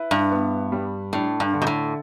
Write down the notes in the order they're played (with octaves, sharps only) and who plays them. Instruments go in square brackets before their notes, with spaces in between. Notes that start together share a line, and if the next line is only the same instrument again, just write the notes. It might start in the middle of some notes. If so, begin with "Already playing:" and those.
Already playing: [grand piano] E4 B4
[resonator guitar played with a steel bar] G2
[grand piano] B3
G3
[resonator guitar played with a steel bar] A2 [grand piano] D4
[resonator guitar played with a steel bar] G2
[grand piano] D3
[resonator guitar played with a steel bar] B2
A2